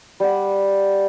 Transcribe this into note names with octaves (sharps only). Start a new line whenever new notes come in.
G3 F#5